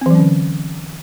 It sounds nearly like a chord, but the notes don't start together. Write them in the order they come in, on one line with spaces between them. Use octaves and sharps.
C4 E3 F#3 C#4 D3